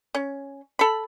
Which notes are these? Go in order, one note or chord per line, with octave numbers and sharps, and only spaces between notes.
C#4
A4 B5